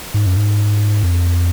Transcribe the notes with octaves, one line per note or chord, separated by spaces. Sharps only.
G#2
F#2
G#2
F2